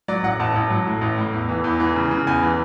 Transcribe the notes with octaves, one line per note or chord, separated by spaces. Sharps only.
F#3 D5
A1 F#5
A1 A5
A1
F#3
A2
A1
A2
E2
E3
E2
E3
C#3
C#3
E2 G#5
E3